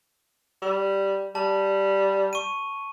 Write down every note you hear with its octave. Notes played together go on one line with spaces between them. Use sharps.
G3
G3 A5
C#6 D#7